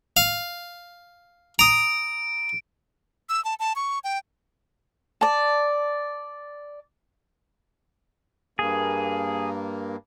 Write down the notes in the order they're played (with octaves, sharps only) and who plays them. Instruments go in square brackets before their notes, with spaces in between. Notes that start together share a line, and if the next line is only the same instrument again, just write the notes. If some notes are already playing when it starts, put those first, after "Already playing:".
[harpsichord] F5
[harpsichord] A#5 D#6 [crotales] D7
[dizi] E6
A5
A5
C#6
G5
[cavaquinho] D5 A5
[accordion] G2 A#3 [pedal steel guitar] G#4